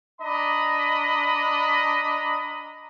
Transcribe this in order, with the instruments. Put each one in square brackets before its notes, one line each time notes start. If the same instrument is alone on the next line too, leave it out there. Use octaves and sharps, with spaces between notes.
[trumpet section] D4 D#5 A#5 B5